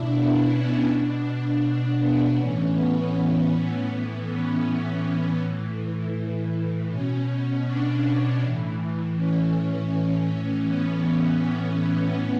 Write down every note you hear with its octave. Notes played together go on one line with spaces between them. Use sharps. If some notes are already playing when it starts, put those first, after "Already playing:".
Already playing: B2 D4 E4
B3
C#4
B2 D4
D4
D4
B3
A2 E3 C#4
B3
C#4
C#4
A2 E3 B3
C#4
C#4
A2 E3
B2 C#4
D4
A2 E3
C#4
C#4
A2 E3 C#4
B3